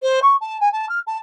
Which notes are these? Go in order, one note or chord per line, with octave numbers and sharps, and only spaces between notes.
C5
C#6
A5
G#5
A5
F6
A5